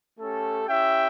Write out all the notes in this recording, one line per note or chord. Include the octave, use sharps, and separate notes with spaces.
A3 C#4 G4 A4
C#4 E4 G4 E5 G5